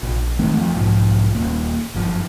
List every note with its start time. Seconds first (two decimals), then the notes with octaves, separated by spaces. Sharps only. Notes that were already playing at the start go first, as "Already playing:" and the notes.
0.03 A#1
0.39 D#3 G#3 A3 C4
0.57 F2 F3
0.74 B1 G#2 F3
1.35 D#1 A#3
1.95 G1 F#2 F3